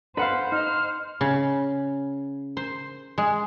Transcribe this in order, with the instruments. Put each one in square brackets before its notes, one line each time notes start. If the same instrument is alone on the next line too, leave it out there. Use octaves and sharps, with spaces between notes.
[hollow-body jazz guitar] D4 A4 B4 [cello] C5 [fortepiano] F5 F#5 B5
[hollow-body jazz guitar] D#4 D#5 [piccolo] F6
[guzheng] C#3
C5
G#3